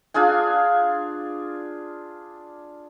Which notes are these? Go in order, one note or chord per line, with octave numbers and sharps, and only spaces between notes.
D4 F4 G#4 G#5